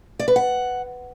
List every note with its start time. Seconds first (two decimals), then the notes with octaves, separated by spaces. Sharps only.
0.19 D5
0.28 B4
0.36 F#5